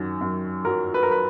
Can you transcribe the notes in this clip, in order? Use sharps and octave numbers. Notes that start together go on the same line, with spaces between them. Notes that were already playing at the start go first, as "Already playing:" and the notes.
Already playing: F#2 D#3 F#3
F#2
F#3 A#4
B4
A#4
B4